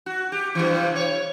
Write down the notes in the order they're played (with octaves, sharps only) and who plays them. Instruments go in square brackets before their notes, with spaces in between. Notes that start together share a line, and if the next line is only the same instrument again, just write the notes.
[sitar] F#4
G4
G2 C3 E3
C#5